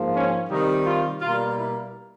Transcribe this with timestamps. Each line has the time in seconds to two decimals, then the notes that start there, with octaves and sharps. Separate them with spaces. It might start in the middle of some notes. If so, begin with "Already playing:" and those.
Already playing: G#2 F3 A#3
0.13 C#4
0.49 C3 D#3 G3 D#4
0.85 F4
1.21 B2 G3 A#3 F4
1.56 E4